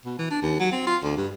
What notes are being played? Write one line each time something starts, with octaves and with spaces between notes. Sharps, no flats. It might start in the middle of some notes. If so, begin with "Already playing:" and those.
B2
E3
D4
D#2
F#3
C4
F4
D2
G2